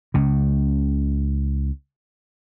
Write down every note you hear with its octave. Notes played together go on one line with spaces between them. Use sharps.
C#2 C#3